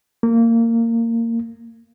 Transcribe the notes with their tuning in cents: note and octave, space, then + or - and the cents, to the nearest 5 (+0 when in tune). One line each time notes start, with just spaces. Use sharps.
A#3 -20